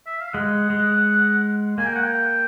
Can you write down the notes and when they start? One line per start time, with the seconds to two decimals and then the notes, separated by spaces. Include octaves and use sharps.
0.06 E5
0.20 F5
0.34 G#3 F#5
0.70 G#3
1.78 A#3 G#5
1.86 G5
1.95 F#5
2.03 G5